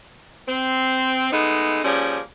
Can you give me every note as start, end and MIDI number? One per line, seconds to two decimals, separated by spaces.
0.48 1.29 60
1.32 1.81 56
1.32 1.81 57
1.32 1.81 59
1.32 1.81 63
1.84 2.20 53
1.84 2.20 55
1.84 2.20 58
1.84 2.20 61
1.84 2.20 68